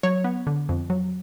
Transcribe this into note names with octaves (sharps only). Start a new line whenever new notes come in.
F#3 C#5
B3
D3
F2
F#3